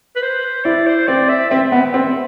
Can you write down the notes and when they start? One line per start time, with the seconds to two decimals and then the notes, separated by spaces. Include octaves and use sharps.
0.16 B4
0.22 C5
0.65 E4 D5
0.87 C5
1.08 C4 D5
1.29 E5
1.50 C4 E5
1.72 B3
1.94 C4